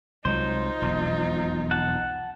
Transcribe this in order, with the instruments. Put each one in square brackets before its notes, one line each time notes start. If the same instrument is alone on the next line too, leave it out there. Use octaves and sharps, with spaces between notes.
[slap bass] C2 F#3 G#3 [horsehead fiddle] D#4 F4 [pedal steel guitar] C5
[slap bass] E1 B1 F2
[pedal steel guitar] F#5 A5